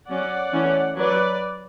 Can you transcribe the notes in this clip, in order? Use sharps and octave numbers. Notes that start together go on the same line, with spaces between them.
F#3 C#4 D5 F#5
E3 A3 C#4
F#3 B4 D5